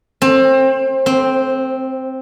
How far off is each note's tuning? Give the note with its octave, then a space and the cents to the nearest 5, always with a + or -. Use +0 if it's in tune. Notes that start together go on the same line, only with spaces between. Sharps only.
C4 +25
C4 +0